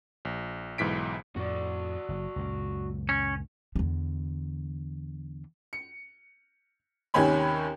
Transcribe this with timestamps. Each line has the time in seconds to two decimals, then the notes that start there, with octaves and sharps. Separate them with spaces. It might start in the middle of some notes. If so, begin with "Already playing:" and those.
0.25 A#1
0.78 B1 G#2 E3 B6 D7
1.36 F2 A2 F#4 D5
2.09 F#1
2.36 C#2 F#2 A#2
3.09 C#4
3.76 E2 D3
5.73 C#7
7.14 D#2 C3 D#3 C#4 G#5 B5